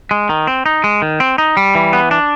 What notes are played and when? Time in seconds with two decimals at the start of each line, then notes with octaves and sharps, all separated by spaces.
0.11 G#3
0.29 D#3
0.47 C4
0.66 D#4
0.84 G#3
1.02 D#3
1.20 C4
1.38 D#4
1.57 G3
1.75 E3
1.93 B3
2.11 D4